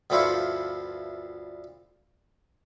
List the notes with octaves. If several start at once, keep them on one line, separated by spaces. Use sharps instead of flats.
D2 G2 F3 E4 F4 C#6